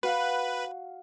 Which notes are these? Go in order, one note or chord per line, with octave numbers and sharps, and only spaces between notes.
F#4 B4 F5